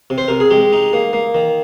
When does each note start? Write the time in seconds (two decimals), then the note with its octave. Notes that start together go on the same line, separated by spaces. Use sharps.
0.10 C3
0.18 C5
0.28 C3 A#4
0.40 G#4
0.51 G#3 G4
0.72 D#4
0.93 A#3
1.13 A#3
1.35 D#3